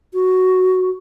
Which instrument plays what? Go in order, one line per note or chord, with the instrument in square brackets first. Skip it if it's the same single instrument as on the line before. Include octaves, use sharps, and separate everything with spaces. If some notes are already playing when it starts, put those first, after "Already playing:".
[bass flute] F#4